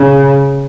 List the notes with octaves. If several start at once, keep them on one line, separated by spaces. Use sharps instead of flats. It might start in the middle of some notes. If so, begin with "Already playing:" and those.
Already playing: C#3